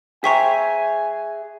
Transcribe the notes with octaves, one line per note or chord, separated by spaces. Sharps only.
G#4 C5 E5 G5 G#5 A#5 C#6 B6